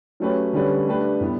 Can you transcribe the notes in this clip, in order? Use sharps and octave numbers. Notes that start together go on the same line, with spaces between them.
F#3 A3 C#4 G4 B4
D3 G3 C#4 G4 B4
A3 D4 G4 B4
A2 G3 B3